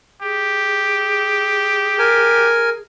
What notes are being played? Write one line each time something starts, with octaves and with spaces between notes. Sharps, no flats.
G4 G#4
A#4 G#5